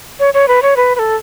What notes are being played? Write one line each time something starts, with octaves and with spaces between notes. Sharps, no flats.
C#5
C#5
B4
C#5
B4
B4
A4